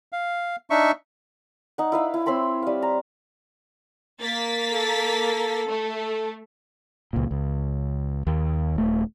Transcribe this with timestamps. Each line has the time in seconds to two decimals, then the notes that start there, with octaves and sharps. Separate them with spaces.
0.12 F5
0.70 D4 D#4 E5 C#6
1.78 D#4 F#5
1.92 E4 B4 F5
2.14 E4
2.26 C4 C#5 B5 C6
2.63 G3 F5
2.82 A#5
4.20 A#3 A6 B6
4.71 A4
5.68 A3
7.13 C#2 A#2
7.31 C#2
8.27 D#2
8.76 D#1 A3